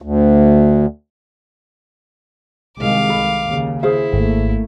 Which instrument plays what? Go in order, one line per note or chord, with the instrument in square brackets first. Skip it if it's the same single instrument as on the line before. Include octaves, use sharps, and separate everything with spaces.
[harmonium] D2
[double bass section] C2 D#3 G#3 [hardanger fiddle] F5 D6
[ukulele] A4 B5
[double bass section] D#2 C#3
[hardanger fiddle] E4 [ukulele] G#4 C5 F5
[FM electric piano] G#1 [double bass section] A3 A#3